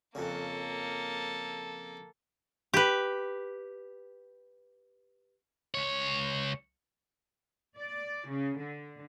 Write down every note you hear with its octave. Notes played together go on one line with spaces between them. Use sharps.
F2 C#3 A#3 A4
G4 B4
C#2 C#5
D5
C#3
D3